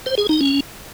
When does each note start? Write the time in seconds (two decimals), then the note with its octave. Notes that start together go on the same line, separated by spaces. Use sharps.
0.06 C5
0.18 G#4
0.29 D#4
0.41 C#4